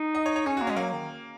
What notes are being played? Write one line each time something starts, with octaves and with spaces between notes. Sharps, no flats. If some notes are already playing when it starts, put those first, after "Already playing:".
Already playing: D#4
D#5
C#5
C#5
C#4 G#4
A#3 F#4
G#3 C#4
F#3 A#3
D#3